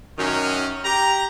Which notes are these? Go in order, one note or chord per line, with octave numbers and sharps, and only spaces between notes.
F#2 D#3 C#4
G4 A#5